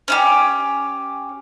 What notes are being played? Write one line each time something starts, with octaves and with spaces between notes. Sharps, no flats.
C#4 E4 G4